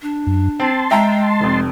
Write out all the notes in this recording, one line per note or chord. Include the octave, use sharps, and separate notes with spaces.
D4
F#2
C4 A5 C6
G#3 E5 G5 A#5
F1 F2